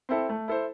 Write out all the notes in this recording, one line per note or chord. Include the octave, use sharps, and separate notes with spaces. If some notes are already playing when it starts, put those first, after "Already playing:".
C4 E4 A4
A3
E4 A4 C5